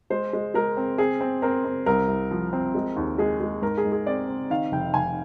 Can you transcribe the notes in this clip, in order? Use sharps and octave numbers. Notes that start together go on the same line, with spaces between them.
G#3 C5
G#3
G#3 A#4
C4
C4 G#4
C4
C4 A#4
C4
C2 A#4
C2
F3
C4
G#3
D#2
G#3 G#4
G#3
G#2 A#4
G#4
G#2
G#4
C4 D5
C4
D#3 F5
F1 G5
F1 G#5